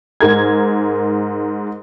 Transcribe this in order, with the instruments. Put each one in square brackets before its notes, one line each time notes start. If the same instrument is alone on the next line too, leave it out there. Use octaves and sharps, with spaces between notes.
[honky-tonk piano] G#2 A#4 G#6